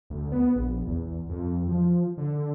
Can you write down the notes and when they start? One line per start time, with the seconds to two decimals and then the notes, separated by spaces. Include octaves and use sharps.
0.10 D2
0.32 B3
0.56 A#1
0.87 E2
1.29 F2
1.69 F3
2.18 D3